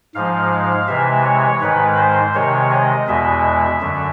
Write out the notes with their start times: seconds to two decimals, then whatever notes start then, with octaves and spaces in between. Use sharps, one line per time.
0.15 G#2 F3 G#3 F5
0.51 F5
0.88 C3 E3 G#3 E5
1.24 C#5
1.61 G#2 D#3 G#3 B4
1.98 C5
2.34 C3 D#3 G#3 C#5
2.71 D#5
3.08 E2 B2 G#3 E5
3.81 F#2 D3 F#3